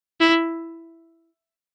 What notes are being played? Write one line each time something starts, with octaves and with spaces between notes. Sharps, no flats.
E4